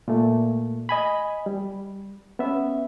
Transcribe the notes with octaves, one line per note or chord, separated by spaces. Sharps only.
A#2 A3
D#5 G#5 B5
G3
B3 C#4 E5